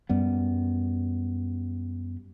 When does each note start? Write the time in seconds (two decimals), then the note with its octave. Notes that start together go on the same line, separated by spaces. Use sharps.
0.09 F#2 G3 B3